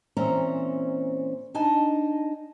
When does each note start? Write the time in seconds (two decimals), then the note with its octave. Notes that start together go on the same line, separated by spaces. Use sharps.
0.17 A#2 E3 C4 C#4 C#5 A#5
1.54 D4 D#4 D#5 G#5 A5